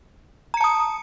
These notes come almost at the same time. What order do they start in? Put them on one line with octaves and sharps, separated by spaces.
A#5 C#7 A5 D#6